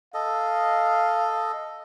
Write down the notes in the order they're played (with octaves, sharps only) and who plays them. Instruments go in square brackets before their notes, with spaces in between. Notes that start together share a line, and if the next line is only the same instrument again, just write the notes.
[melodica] A4 D#5 [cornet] F5